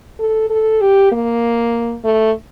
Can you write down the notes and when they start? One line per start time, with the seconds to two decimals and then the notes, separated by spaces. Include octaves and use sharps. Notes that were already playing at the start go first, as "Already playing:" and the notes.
0.19 A4
0.50 A4
0.81 G4
1.12 A#3
2.04 A3